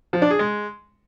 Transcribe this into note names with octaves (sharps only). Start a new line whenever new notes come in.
F3
D4
G#4
G#3